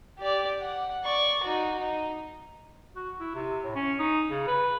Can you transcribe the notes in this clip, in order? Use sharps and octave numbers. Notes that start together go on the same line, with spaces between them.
G4 D5
F#5
D5 C#6
D#4 F#4
D#4
F#4
E4
C3
A2
C#4
D#4
C#3
B4